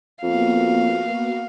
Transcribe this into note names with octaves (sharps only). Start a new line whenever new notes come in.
F2 A#3 B3 F#4 F5